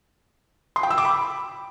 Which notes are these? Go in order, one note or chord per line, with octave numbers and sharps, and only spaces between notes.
C6
G5
E6
D6
B5